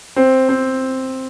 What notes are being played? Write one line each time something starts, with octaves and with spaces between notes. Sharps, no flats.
C4
C4